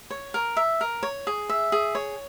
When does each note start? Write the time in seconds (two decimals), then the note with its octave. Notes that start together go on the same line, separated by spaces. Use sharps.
0.10 C#5
0.34 A#4
0.57 E5
0.81 A#4
1.03 C#5
1.27 G#4
1.49 E5
1.72 G#4
1.95 C#5